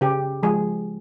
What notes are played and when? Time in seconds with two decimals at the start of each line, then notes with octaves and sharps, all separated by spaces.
0.01 C#3 G4
0.43 F3 G#3 G#4